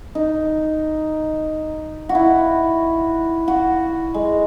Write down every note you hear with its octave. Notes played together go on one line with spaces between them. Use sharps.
D#4
F#4
E4
F#4
G#3